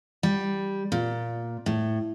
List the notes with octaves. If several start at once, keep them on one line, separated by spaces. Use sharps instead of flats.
G3
A#2
A2